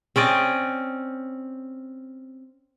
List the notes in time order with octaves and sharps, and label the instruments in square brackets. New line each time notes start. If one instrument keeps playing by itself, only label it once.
[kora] C4 C#4 D5 D#5